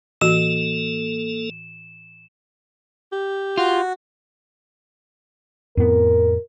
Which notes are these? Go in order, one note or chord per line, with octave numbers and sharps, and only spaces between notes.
A2 E3 A#3 F#4 A4 E7
G4
F4 F#4
F2 A2 B3 A#4